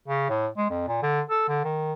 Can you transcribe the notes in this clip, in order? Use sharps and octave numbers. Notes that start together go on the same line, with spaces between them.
C#3
A2
G#3
F2
A#2
D3
A4
D3
D#3